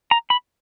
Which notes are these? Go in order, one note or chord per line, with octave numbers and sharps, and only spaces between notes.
A#5
B5